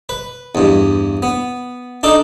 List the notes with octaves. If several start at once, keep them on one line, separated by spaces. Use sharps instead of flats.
B4
E2 G2
B3
D4 D#4 A4